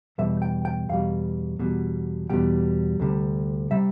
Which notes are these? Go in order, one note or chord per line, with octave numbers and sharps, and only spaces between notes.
E2 B2 G3 E5
G5
G5
E2 B2 G3 F5
E2 B2 G3
E2 B2 G3 G5
D2 C3 G3
C3 G3 E5